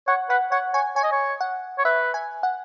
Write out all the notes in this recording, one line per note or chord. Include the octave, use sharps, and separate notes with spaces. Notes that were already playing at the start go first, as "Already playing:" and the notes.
C#5 F#5
B4 F#5
C#5 F#5
C#5 G#5
C#5 G#5
D#5
C#5
F#5
C#5
B4 E5
G#5
F#5